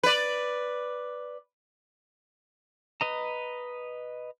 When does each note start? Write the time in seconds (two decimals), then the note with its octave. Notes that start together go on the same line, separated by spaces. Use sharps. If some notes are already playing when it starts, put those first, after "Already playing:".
0.03 B4 D5
3.01 B4 D#5 A#5